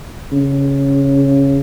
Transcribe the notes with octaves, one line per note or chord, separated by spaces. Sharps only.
C#3